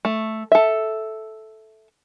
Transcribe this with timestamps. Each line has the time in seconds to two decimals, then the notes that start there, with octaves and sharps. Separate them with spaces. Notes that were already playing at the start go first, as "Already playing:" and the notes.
0.05 A3
0.52 A4 E5